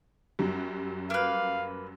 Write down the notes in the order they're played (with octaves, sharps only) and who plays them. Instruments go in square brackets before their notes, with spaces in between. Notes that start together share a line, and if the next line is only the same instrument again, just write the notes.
[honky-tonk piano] F#2 F#3 G3
[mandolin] A#3 B4 [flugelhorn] F5